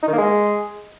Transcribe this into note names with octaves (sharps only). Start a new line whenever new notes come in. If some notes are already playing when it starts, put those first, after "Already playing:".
D#4
D#3
A#3
G#3